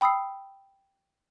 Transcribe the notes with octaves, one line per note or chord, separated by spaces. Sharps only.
G5 B5 D#6 E6 C7